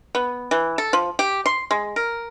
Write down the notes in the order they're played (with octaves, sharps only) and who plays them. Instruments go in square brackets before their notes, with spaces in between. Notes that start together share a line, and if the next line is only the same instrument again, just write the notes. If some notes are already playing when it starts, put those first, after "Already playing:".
[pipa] B3
E3
A4
F3
G4
C6
G#3
A#4